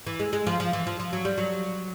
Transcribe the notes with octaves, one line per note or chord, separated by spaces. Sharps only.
E3
G#3
G#3
F3
F3
E3
F3
F3
F#3
G3
F#3